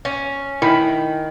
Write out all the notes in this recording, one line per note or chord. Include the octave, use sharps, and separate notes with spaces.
C#4
D#3 E4 G#5 B5